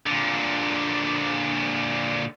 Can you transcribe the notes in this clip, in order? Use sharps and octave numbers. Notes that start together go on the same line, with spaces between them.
A#2 D3